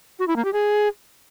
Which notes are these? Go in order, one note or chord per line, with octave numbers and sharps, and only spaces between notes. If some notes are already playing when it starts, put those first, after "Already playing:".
F#4
E4
A#3
G4
G#4